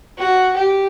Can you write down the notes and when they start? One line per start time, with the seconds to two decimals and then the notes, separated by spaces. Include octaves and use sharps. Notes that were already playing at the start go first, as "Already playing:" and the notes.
0.18 F#4
0.57 G4